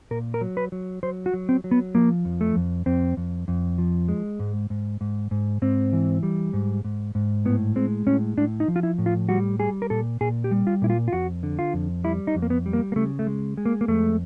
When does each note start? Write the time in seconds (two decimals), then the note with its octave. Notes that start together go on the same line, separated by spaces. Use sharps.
0.11 A#2 A#4
0.34 A#4
0.41 F#3
0.57 B4
0.72 F#3
1.03 F#3 C5
1.26 F#4
1.34 F#3
1.49 C4
1.64 F#3
1.71 B3
1.95 F3 A#3
2.25 F2
2.41 A3
2.56 F2
2.86 F2 C4
3.17 F2
3.48 F2
3.78 F3
4.08 G#3
4.40 G#2
4.70 G#2
5.01 G#2
5.31 G#2
5.62 G#2 C4
5.93 E3
6.23 G3
6.53 G#2
6.84 G#2
7.15 G#2
7.45 A2 B3
7.76 G#3 C4
8.07 A2 C#4
8.37 A2 D4
8.60 D#4
8.68 F3
8.76 F4
8.83 E4
8.98 A2
9.06 F4
9.29 G3 F#4
9.59 G3 G#4
9.82 A#4
9.90 A#2 A4
10.21 A#2 G#4
10.44 G4
10.51 G3
10.67 F4
10.82 A#2 E4
10.90 F4
11.08 F4
11.13 F2 F#4
11.43 D3
11.59 F4
11.74 F2
12.04 G3 E4
12.27 D#4
12.35 F2
12.42 A#3
12.50 B3
12.66 G3
12.73 A#3
12.92 A#3
12.96 C#3 A3
13.19 A3
13.27 G#3
13.57 G#3
13.65 A#3
13.81 A#3
13.88 F2 A3